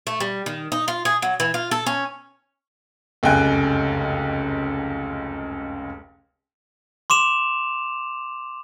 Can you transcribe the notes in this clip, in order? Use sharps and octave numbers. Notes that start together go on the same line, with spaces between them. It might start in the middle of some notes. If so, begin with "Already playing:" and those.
A3
G3
D#3
D#4
F4
G#4
F#3
E3
F4
A4
C#4
F1 C#2 F#2 G5 G#5 F#6
C6 D6 E7 F7